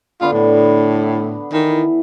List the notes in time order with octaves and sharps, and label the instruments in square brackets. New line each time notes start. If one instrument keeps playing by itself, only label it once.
[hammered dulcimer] D3 B3 D4 [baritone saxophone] F4
[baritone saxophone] A2
[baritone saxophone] D#3 [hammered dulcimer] E3